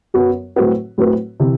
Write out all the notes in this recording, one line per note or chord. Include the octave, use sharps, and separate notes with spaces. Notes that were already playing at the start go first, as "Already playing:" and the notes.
F#2 F#3 B3
A2 F#3 C4 F#4 B4
A2 F#3 C4 F#4 B4
C3 E3